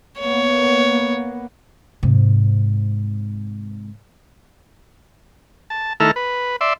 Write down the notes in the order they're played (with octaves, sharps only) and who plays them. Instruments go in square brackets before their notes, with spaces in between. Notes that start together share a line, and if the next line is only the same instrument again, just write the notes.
[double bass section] A#3 B3 [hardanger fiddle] C#5
[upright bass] G#2 C3
[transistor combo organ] A5
D#3 A3 E4 A4 A#5 F6
B4
D5 E5 C6